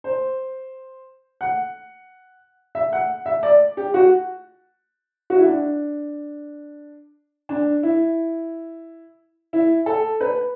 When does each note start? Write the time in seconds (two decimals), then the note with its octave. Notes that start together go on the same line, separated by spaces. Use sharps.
0.04 C5
1.41 F#5
2.75 E5
2.93 F#5
3.26 E5
3.43 D5
3.77 G4
3.94 F#4
5.30 F#4
5.38 E4
5.46 D4
7.49 D4
7.83 E4
9.53 E4
9.86 A4
10.21 B4